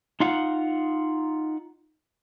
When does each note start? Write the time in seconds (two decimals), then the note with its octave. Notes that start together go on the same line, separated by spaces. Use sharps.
0.20 D#4 F4 F5 F#5